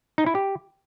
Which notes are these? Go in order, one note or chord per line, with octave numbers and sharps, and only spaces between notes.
D#4
E4
G4